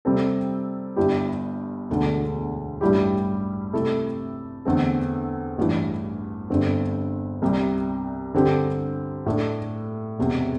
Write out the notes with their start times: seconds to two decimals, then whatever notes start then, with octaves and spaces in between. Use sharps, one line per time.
0.05 C3 G3 C4 A4
0.97 G1 G2 G3 E4 G4
1.90 E1 D2 D3
2.81 A1 G2 G3 E4 G4
3.73 C3 A3 E4 A4
4.65 E2 D3 A3 C4 A4
5.58 A1 G2 E3
6.50 G1 G2 D3 C4
7.42 C2 C3 G3
8.34 G2 D3 C4 G4
9.26 A2 A3 D4 A4
10.18 E1 E2 C3